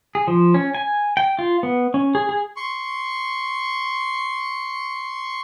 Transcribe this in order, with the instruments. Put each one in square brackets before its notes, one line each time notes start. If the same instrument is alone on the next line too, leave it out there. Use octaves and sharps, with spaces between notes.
[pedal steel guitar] G#4
F3
C#4
G#5
G5
F4
B3
C#4
G#4
G#4
[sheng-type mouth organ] C6 C#6